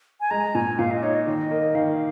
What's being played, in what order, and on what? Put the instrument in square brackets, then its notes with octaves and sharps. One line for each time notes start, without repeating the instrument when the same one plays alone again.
[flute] G#5
[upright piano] G#3 [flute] A#5
[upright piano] A#2 [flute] G#5
[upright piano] A#2 [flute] F5
[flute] D#5
[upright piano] D#4 [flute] C#5
[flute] D#5
[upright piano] D#3
A#3
[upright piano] D#3 [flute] F5